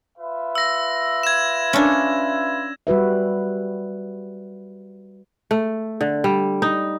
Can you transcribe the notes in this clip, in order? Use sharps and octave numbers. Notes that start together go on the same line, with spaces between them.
F4 B4 E5
E6 A#6
G#6 E7
C#4 D4
G3 F#4 B4 E5
A3
D3
G3
D#4